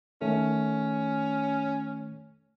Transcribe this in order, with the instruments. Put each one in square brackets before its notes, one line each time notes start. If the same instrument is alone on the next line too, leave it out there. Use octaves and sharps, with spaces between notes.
[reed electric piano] D#3 A3 [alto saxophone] C#4